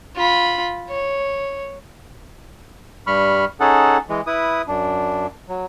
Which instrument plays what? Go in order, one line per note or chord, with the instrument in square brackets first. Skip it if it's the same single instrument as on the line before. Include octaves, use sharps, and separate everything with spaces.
[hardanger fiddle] F4 B5
C#5
[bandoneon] G2 G3 B5 C#6 F6
C#4 D#4 G#4 A4 F#5 A5
E3 G#3
E4 B4 D#6
F#2 D4
F#3